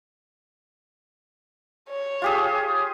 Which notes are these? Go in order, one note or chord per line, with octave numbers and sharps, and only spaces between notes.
C#5
F4 G4 G#4